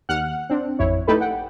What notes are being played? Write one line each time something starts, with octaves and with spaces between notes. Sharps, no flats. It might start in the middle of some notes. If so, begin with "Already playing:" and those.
D#2 F#5 F6 F#6
C4 D4
A1 F2 E4 C#5
A3 D#4 E4 G4 A4 B4
F#5 G5